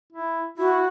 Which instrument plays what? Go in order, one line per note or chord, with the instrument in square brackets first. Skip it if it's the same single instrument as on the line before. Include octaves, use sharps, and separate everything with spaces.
[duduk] E4
[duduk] E4 [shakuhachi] F#4